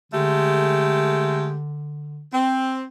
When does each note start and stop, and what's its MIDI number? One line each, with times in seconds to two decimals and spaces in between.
0.12 2.26 50
0.12 1.55 56
0.12 1.55 57
0.12 1.55 67
2.33 2.84 60